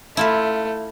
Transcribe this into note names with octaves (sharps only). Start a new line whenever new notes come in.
A3 E4 F4 E5